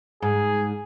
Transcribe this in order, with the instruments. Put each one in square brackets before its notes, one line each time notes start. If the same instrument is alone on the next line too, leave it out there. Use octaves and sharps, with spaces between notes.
[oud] G#2 [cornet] G#4